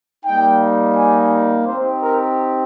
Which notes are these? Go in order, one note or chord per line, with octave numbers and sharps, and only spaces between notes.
G3 A#3 D#4 G5
G#5
C4 D#4 G4 C5
A#4